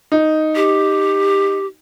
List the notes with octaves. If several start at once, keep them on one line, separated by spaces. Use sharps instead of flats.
D#4
G4